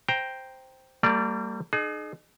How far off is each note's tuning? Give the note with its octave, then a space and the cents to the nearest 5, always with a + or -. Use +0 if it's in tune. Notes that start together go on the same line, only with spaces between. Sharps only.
C5 +0 G5 +0 A#5 +5
G3 -5 A#3 -45 D5 +0
D#4 -35 G#4 +35